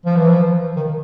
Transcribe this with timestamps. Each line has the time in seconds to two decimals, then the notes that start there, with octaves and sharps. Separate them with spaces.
0.06 F3
0.16 E3
0.28 F3
0.76 D#3